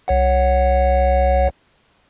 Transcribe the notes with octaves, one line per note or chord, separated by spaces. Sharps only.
C2 C#5 F#5